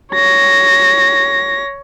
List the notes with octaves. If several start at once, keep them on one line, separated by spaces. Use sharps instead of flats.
C#5 A#6